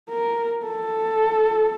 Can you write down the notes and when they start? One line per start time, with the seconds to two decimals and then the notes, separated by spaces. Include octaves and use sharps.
0.09 A#4
0.65 A4